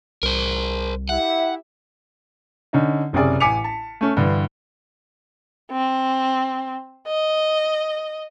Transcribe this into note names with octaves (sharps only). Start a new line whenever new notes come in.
C2 A#4 C5
E4 G4 E5 F#5
D3 C#4 D#4
F#1 C3 C#4 G#4 D5
A1 G#5 D6 B6 C#7 F7
A5
A3 C#4
G2 D3 E3
C4
D#5